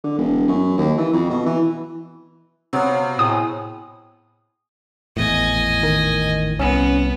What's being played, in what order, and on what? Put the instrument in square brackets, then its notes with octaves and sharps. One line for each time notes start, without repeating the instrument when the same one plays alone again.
[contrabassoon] D3
E1
F#2
D#2
E3
F2
B2
E3
[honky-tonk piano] C3 [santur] F#3 B3 F5
[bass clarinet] A2 [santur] G#3 [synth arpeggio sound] D#6
[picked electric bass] G#1 E2 A2 [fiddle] D#5 G#5
[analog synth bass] D#3
[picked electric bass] C2 [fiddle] B3 [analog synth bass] C#4